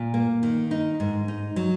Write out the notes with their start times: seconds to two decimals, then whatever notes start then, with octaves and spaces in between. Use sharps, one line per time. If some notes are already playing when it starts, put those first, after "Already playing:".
Already playing: A#2
0.14 A#3
0.43 D#3
0.71 D#4
1.00 G#2
1.28 D#4
1.56 F#3